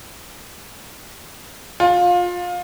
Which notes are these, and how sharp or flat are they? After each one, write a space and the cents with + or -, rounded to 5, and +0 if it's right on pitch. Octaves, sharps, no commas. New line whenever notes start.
F4 +25